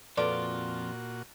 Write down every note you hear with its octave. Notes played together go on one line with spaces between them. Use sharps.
F2 A#2 C4 F4 F#4 A4 B4 D5